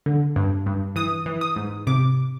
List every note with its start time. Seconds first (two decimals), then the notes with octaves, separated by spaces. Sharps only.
0.06 D3
0.36 G2
0.66 G2
0.96 E3 D#6
1.26 E3
1.41 D#6
1.56 G#2
1.87 C3 D6